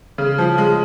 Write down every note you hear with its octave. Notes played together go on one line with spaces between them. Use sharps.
C#3
F3
G#3